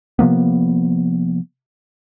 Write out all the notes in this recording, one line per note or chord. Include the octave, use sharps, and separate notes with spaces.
C3 F3 A#3 B3